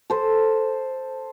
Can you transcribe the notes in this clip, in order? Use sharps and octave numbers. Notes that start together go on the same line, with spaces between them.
A4 C5